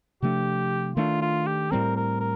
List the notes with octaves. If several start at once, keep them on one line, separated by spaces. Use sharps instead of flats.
C3 F3 A3 D4 G4
D#3 A3 D4 F4
F4
G4
A2 G3 C4 A#4
A#4
A#4